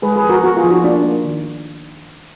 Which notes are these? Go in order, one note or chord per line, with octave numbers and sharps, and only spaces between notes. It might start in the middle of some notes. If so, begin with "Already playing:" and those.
G#3 G#4 B4
G#4 B4
F3
F#4 A#4
B3 F#4 A#4
F4 G#4
F3
D#4 F#4
A#3 D4 F4
A#3
D#3